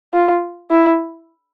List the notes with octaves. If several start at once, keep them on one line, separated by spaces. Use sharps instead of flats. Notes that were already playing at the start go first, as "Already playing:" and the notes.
F4
E4